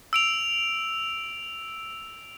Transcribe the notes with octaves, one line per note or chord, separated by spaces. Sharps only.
E6 D7 F7